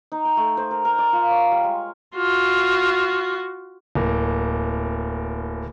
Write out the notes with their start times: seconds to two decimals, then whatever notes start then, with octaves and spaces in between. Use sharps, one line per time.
0.12 D#4
0.25 G5
0.37 A3
0.57 C5
0.71 A#4
0.85 A#4
0.99 D5
1.13 F4
1.31 C#5
1.52 G3
1.64 G#3
2.16 F4 F#4
3.95 D1 A#3